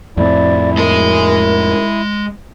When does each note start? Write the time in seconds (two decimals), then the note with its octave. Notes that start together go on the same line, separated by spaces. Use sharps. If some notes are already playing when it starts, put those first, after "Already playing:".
0.17 F2 A2 C4 E4 D5
0.78 G#3 A#4 D#5